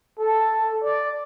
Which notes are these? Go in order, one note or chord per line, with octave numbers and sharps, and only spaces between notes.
A4
D5